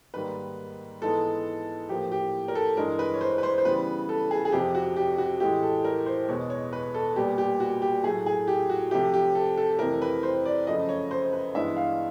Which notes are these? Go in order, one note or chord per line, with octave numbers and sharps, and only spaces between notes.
G#2 D#3 G3 A#3 B4
G#2 E3 G#3 B3 A4
A2 F3 A#3 G4
G4
A#4
A4
G2 E3 G#3 A#4
B4
C#5
C5
B4
C5
C5
C#3 E3 G3 B3 B4
A4
G#4
G#4
F2 C3 F3 G4
F#4
G4
F#4
A2 E3 G#3 G4
A4
A#4
C5
E2 B2 G#3 B3 C#5
C#5
B4
A4
A#2 G3 B3 G4
G4
F#4
G4
A2 F#3 A3 G#4
G#4
G4
F#4
C3 F3 A3 G4
G4
A4
A4
F2 C3 E3 A3 A#4
B4
C5
D5
F#2 C#3 F3 A3 D#5
C#5
C5
B4
G2 E3 G#3 B3 E5
F5